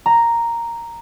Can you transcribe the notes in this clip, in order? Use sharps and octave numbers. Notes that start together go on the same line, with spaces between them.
A#5